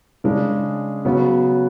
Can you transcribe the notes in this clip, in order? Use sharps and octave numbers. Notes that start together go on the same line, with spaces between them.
C#3 G#3 D4
C#3 F#3 B3